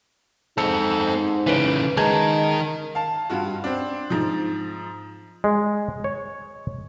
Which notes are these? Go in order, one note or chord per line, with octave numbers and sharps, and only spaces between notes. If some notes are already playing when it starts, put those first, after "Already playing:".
G#2 C4 D#4 A4 E6 C#7
C#3 E3 C#4 B4 D7
D#3 G#3 A#4 D#5 A5 G#6
F5 A5
G2 F4 F#4
C4 D4
G#2 F3
G#3
C#5